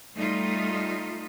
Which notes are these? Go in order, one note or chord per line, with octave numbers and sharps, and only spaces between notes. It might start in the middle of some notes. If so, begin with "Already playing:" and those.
G3 A3 D#4 F4